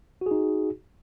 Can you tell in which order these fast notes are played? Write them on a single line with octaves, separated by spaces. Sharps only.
F#4 G#4 D#4